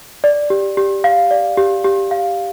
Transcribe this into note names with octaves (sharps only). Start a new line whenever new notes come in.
D5
G4
G4
F5
D5
G4
G4
F5